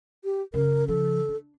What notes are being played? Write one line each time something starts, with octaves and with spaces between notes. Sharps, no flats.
G4
F#2 C#3 A#4
C#3 F3 A4
D4